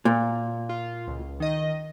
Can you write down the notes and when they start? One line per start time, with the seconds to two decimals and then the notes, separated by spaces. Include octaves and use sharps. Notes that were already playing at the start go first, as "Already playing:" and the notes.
0.05 A#2
0.69 F4
1.07 C#2
1.40 D#3 D#5